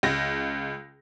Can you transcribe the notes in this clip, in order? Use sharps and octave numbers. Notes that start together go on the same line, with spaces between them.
C#2 A#6